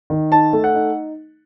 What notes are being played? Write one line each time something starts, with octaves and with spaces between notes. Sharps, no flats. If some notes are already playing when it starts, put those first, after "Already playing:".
D#3
D#4 A5
A3
F#5
D#4